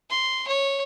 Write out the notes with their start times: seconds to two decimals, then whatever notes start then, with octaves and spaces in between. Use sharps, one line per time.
0.10 C6
0.48 C#5